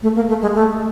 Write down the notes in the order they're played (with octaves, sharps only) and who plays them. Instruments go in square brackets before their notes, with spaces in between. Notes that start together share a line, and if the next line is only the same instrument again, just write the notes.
[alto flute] A3
A#3
A3
G#3
A3